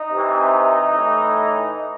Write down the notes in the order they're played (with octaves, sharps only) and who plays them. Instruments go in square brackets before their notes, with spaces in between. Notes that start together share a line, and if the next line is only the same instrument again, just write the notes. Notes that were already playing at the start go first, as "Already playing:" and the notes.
Already playing: [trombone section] D#4
C3 E3
A2 E3